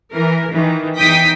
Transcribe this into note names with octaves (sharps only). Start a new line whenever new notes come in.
E3 A#4
D#3 E3
E2 E3 D#4 G5 D#6 B6